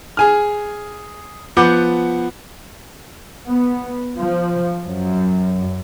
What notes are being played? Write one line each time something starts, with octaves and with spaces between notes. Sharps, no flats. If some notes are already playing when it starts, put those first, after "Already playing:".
G#4 G#5 F6
F3 B3 F#5 B5 D6 G6
B3
F3
F#2